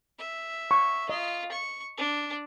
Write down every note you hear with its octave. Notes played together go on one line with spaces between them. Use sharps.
E5
C#6
F4 D#5
C#6
D4